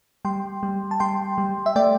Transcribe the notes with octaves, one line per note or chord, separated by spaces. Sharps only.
G3 G5 C6
G3
A5
G3 G5 C6
G3
E5
A3 D5 G5